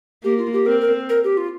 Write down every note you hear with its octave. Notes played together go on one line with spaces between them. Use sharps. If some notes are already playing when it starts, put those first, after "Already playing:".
A#3 G4
F4
G4
C4 A#4
A#4
A#4
G4
F4